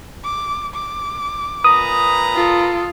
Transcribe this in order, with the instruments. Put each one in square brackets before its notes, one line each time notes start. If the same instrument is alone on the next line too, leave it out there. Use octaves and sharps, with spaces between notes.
[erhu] D6
D6
[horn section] A#2 B4 A#5 [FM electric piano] D#6
[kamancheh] F4 [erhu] A4